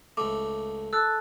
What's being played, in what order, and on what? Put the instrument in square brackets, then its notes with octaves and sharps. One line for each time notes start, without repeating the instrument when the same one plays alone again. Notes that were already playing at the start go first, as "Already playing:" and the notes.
[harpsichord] C#2 A3 [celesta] D6
[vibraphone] A4 A5 [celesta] E6 F#6